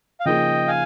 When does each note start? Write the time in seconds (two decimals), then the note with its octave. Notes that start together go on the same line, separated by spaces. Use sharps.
0.20 F5
0.25 C#3 F3 A#3 D#4 G#4 D#5 G5
0.68 F5 G#5